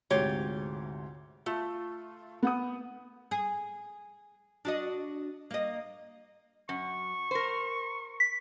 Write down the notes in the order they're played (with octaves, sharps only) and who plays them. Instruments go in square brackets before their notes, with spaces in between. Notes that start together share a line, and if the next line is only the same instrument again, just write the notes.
[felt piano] D2 G#2 C3 [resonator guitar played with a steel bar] F4 G4 C#5
[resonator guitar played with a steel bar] A3 [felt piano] F4
[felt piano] B3 F#5 D#6
[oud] G#4
D4 F#4 D#5
A#3 D#5
[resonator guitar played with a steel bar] F#2 [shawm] C#6
[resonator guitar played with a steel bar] A#4 C5
[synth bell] B6